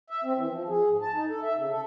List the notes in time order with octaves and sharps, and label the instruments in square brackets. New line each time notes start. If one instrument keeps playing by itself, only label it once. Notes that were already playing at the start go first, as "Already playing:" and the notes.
[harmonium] E5
C4
E3
F3
G#4
G#2
A5
D#4
A4
E5
C#3
A4